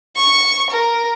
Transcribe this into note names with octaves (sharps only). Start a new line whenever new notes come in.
C#6
A#4